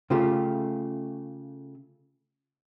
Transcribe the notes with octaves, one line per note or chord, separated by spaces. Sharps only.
C#3 A3 F4 G4